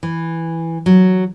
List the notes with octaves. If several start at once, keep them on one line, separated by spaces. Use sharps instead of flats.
E3
F#3